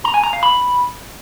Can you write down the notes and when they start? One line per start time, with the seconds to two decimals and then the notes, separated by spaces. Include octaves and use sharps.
0.04 A#5
0.14 G#5
0.24 A#5
0.33 F5
0.43 B5